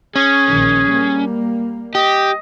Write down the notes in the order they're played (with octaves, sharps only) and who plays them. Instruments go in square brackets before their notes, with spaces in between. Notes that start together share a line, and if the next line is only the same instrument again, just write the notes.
[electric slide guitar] C#4 [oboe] G#4
[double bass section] A#1 D#3
G3 A#3
[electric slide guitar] G4 [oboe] D#5